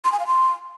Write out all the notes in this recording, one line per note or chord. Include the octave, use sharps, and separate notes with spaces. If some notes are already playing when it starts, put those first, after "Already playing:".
C6
G#5
F5
C6